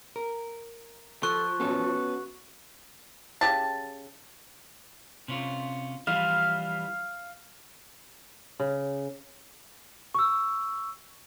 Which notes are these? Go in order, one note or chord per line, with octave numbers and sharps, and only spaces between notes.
A#4
F3 A4 C#6 F#6
B3 C#4 F#4 A4
C#3 G4 A5
C3 C#4 F4
E3 F3 G3 F5
C#3
C#6 E6